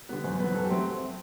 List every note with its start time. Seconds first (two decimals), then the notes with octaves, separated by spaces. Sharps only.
0.09 D3 G3 B3 B4
0.24 F#2 C5
0.39 F#3 B3 B4
0.55 F#2 A4
0.65 G4
0.70 F#3 A3 C4